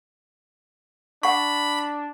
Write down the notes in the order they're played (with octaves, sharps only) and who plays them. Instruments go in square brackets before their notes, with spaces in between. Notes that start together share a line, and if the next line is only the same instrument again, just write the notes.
[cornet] D4 [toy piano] F#5 C#6 [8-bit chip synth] B5